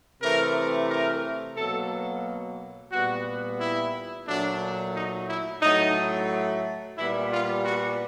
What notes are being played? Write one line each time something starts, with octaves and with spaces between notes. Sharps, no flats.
C3 E3 A3 A#4
A#4
B2 F#3 A#3 A4
A#2 G3 B3 F#4
E4
A#2 F#3 A3 D4
D#4
E4
A2 F#3 A3 D#4
A#2 G3 B3 E4
F4
F#4